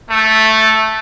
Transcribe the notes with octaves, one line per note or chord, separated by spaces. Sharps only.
A3